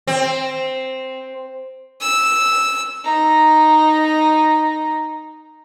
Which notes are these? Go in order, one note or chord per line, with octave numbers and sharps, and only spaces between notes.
C4
E6
D#4 A#5